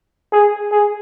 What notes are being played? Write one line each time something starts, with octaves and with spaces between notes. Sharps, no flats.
G#4
G#4